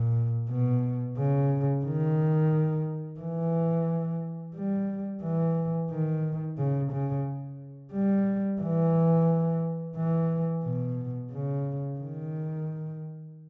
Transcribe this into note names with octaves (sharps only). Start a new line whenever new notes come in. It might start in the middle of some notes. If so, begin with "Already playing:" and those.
Already playing: A#2
B2
C#3
D#3
E3
G3
E3
D#3
C#3
C#3
G3
E3
E3
B2
C#3
D#3